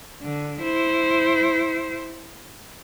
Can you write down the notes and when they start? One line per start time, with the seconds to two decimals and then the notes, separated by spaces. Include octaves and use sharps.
0.23 D3
0.62 E4 C5